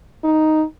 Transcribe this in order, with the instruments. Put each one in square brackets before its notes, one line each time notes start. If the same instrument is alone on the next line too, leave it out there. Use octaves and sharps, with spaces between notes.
[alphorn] D#4